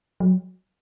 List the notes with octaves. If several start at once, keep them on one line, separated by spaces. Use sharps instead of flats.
F#3